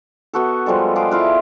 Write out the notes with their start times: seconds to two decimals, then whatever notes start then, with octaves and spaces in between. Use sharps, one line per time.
0.33 B3 F#4 A4
0.66 F3 G3 G#3 A4
0.96 G#4 F5 G5 D6
1.11 E4 F4 B4